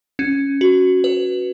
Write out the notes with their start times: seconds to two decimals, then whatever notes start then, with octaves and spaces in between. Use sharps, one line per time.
0.19 C#4
0.61 F#4
1.04 B4